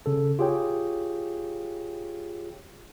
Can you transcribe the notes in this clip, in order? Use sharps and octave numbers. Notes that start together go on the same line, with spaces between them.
C#3 A4
F4 G4 G#4 C#5 G5